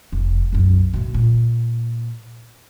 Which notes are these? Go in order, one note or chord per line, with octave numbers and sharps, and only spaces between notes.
F1 F2
B1 F#2
B2 A3
A#2